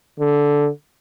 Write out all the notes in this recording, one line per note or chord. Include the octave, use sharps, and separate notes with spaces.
D3